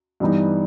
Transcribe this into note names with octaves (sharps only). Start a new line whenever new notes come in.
G2 E3 G3 B3 D#4